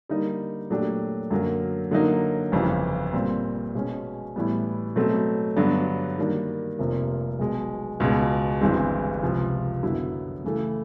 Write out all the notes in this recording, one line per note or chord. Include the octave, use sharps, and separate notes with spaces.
D3 G3 A#3 D#4
A#2 F#3 A3 D4 G4
F#2 D3 F#3 A#3
D3 F#3 A#3 D#4
G1 F2 C#3 E3
A#2 G3 C4
B2 G#3 C#4
A2 E3 G3 B3
B2 F#3 A3 C4
G2 D3 F#3 B3 D4
D#3 G3 A#3 D4
F1 F2 C3 F3 A#3
B1 B2 G#3
C#2 B2 G#3
G1 G2 E3 G#3 C4
C#2 C3 F3
F#2 D3 F#3 B3 E4
C#3 E3 A3